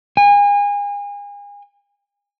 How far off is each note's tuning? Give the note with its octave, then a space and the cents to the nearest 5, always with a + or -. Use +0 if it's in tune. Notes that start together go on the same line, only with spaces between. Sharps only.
G#5 -35